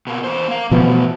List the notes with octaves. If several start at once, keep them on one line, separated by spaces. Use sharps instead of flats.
B2 A#3
E2 C5
A#3 F5
B2 E3 F3 A3 B3